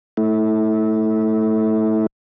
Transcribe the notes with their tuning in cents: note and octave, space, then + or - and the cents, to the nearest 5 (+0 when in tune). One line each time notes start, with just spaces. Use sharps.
A3 +0 E4 -25